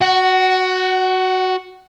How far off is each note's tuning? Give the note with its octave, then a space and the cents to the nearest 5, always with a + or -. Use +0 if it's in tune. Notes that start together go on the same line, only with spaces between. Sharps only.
F#4 +0 F#5 +25